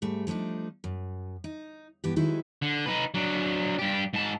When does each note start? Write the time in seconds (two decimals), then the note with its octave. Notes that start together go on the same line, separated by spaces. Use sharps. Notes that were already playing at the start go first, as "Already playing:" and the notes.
0.02 G#2 G3 A3
0.27 F3 A3 C4 D4 D#4
0.84 F#2
1.44 D#4
2.04 G2 E3 B3 G4
2.16 D#3 F#3 G#3 D#4 E4 B4
2.62 D3
2.86 D#4 B4
3.14 F#3 D4
3.79 G2 G4
4.14 G#2 A5